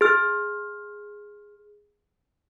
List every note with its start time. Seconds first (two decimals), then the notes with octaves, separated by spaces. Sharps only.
0.01 G#4 F6